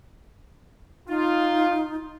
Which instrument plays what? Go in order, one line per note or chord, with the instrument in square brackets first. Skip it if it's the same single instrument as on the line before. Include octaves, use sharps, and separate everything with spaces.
[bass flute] D#4 [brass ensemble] F4